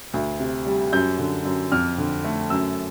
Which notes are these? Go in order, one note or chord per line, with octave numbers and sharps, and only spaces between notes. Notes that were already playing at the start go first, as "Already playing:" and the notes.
D2
C3
G3
F#2 G6
D3
F#2
F2 F6
D3
A3
F#2 E6